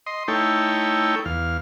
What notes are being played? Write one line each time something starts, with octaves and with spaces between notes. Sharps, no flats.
D#5 C6
A3 D#4 E4 A4 C#5 G5
E2 F5